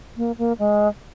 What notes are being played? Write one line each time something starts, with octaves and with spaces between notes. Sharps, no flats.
A#3
A#3
G#3